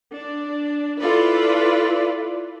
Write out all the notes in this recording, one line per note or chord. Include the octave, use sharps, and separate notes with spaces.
D4
E4 F4 A4 B4 D5